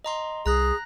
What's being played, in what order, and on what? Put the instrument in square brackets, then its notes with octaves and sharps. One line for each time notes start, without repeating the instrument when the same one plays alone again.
[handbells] D#5 A#5 C6
[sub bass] C2 [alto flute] G#4 [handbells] A#5 F#6 A#6